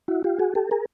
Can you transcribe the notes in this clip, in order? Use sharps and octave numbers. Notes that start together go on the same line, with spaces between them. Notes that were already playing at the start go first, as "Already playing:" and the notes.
E4 F#4
F4 G4
F#4 G#4
G4 A4
G#4 A#4